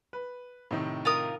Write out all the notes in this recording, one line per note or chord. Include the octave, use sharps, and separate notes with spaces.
B4
A2 C3 D#3
F4 A#4 D#6